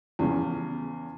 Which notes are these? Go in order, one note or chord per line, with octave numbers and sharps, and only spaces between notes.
E2 C#3 F3